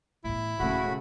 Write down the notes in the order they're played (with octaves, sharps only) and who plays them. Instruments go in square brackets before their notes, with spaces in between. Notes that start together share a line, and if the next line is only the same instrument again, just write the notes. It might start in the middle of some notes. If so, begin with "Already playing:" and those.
[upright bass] E2 A2 [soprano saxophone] E4
[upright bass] D#1 E2 [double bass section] C#3 A3 [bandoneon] F#4 B5